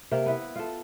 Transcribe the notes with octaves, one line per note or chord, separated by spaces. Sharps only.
C3 A#3
B3 E4
F4 A4